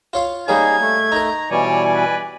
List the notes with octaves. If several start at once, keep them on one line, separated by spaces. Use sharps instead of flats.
F4 C#5 F5
G3 A#3 C#4 D#4 G#4 G#6
A3
D#4 A#4 A#5
B2 E3 G3 C#5 D5 G#5
B4